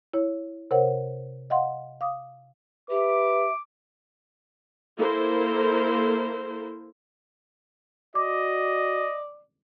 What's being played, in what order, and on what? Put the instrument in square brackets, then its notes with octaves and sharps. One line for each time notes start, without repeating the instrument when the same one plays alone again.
[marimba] E4 C#5
C3 A#4 C5 C#5 F#5
D#5 F5 F#5 C6
F5 D6 D#6
[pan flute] G4 [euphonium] B4 [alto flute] E5 [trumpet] D6
[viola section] A#3 E4 A4 A#4 C5
[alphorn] F#4 [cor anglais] D5 [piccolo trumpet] D#5 [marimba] D6